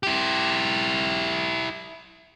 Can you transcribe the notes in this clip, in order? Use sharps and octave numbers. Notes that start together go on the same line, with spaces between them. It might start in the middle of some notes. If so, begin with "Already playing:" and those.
E4 G4